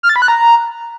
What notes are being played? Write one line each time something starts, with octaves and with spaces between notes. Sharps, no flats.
F6
A6
B5
F#6
A#5